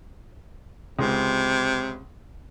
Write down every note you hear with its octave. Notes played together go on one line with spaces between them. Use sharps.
C#2 C3